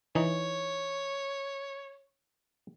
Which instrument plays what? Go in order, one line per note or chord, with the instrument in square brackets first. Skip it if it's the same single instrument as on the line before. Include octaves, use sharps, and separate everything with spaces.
[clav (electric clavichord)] E3 D#4 [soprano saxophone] C#5